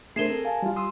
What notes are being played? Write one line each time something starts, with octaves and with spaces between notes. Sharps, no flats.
A3 D4 G#4 A#4 C5 C7 E7 G7
C4 A4
F5 G#5 A5
G3 F4
C6 D#6 E6